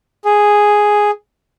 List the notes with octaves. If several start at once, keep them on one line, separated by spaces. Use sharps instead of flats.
G#4